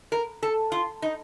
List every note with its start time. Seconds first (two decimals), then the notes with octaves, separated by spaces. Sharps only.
0.12 A#4
0.43 A4
0.72 F4
1.02 D#4